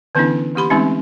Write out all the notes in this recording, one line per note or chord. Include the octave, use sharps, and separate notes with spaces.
D3 E3 B3 C#4 D4 E4
E3 A#3 G4 B5 C6
E3 G#3 A3 C4 C#4 D#4